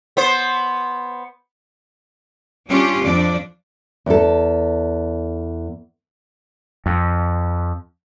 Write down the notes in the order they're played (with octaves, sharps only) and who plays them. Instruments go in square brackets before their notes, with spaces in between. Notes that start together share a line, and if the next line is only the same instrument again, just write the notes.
[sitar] B3 C5
[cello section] G3 C#4 D4 F4 G4
F2 F3 D4 D5
[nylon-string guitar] E2 A4
[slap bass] F2